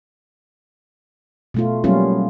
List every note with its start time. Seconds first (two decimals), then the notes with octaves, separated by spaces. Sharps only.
1.54 B2 A3 F4
1.84 F#3 G3 A#3 B3 C#4 F4